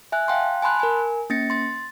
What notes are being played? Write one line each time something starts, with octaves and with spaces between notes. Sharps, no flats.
E5 G#5 F#6
F5 G5 A5 C6 F#6
G#5 A5 B5 C6 F#6
A#4 G#5
A#3 C#4 A6 A#6 C#7
C6 A6